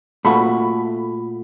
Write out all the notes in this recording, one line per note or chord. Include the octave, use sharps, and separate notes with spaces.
A#2 A3 F#4 B5